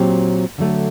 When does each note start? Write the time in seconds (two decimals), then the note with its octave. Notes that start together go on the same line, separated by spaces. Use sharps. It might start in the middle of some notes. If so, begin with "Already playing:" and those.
Already playing: A#2 F#3 C4 G4
0.58 D3 F#3 A3